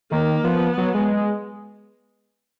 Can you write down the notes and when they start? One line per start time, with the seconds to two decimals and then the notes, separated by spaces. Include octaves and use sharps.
0.12 D#3 A#3
0.44 F3 B3
0.77 F#3
0.94 G#3